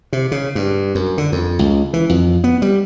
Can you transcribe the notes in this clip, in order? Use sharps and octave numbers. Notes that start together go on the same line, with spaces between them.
C3
C#3
G2
F#2
D3
F2
C#2
E3
F2
B3
G3